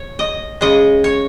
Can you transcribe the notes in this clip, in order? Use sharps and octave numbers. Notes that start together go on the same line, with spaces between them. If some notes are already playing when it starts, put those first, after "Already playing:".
Already playing: C#5
D#5
C#3 G#3 D#5
C#5